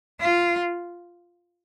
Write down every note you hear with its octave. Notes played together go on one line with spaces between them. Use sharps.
F4